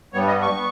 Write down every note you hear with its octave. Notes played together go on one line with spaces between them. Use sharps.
G2 G3 B3 C#5
D#5
C#6
B3